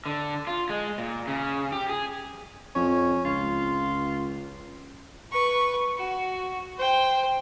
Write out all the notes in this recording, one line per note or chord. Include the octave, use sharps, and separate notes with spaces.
D3
F4
G#3
A#2
C#3
G4
G#4
F2 C#4
C#2 F4
B4 C#6
F#4
C5 G5